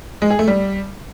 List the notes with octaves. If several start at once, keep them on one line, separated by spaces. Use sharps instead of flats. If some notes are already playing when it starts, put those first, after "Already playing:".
G#3
G#4
A3
G3